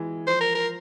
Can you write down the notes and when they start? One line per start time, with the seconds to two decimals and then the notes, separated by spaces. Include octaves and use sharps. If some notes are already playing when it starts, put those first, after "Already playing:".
Already playing: E3 G#3
0.27 F3 C5
0.41 A#4
0.55 A#4